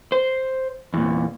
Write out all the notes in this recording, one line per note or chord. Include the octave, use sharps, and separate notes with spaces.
C5
E2 A#2